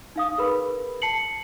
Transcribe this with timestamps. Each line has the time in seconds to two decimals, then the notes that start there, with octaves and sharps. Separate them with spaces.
0.16 D#4 F5 D#6
0.38 G#4 A#4 B4 B5
1.02 A5 C7 C#7 F#7